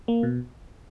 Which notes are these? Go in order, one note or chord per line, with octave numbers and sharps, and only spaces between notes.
A#3
B2